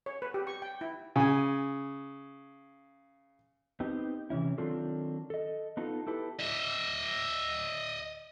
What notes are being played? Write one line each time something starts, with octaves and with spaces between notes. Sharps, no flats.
C#5
B4
G4
C#6
G5
E4
C#3 G#5
B3 C4 D#4 G4
C3 E3 C#4 E4
D#3 F#3 C4 D4 F4 A4
A4 D#5
B3 D#4 F4 A4
E4 G4 A4 B4
D#5 E5